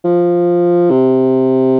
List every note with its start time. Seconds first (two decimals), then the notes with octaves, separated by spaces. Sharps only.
0.05 F3
0.90 C3